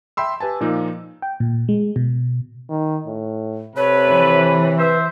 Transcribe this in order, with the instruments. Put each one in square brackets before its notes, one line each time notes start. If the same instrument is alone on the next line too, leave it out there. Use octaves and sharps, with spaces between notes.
[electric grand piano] E5 G5 B5 C6 E6
G4 B4 G#5 A5
A#2 F3 A#3 D#4
[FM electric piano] G5
A#2
G#3
B2
[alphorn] D#3
A2
[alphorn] C3 [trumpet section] A4 B4 [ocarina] C#5
[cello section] E3
[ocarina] B4 [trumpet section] C5 E5